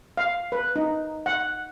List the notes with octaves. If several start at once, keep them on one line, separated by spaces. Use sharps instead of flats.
F5
B4
D#4
F#5